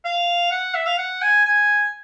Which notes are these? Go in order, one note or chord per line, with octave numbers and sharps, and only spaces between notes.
F5
F#5
E5
F5
F#5
G#5
G#5